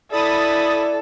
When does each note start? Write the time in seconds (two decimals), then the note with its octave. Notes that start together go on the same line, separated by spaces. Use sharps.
0.12 E4 A4 D5 B5 D#6 A6